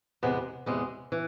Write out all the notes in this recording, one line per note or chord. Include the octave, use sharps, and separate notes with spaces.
E2 C3 G#3 B3
E2 C3 G#3 B3
E3